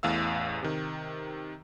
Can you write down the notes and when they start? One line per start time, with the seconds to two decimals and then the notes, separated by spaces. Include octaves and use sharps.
0.03 A1 E2 A2 F5 E6
0.63 C3 D#3